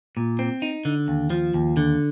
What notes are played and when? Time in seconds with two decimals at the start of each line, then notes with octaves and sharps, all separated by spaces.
0.17 A#2
0.39 C4
0.62 D#4
0.85 D3
1.08 D#2
1.30 F3
1.54 D#2
1.77 D3